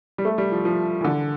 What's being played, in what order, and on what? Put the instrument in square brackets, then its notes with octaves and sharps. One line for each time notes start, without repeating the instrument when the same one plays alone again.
[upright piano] G3
A3
G3
F3
F3
E3
D3